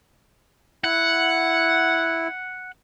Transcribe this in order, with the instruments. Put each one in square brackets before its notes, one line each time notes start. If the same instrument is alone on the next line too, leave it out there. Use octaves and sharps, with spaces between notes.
[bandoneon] E4 [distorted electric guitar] F#5